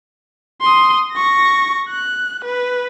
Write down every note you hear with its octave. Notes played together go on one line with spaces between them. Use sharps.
C6 D#6
C#6 A#6
F#6
B4